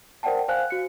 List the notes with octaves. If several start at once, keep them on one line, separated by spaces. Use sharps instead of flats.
A#4 C5 D5 F#5 G5 A5
C5 F5 G#5 F#6
F#4 C#7